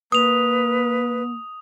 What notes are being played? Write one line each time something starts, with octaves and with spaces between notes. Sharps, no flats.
A#3 B4 D#6 F7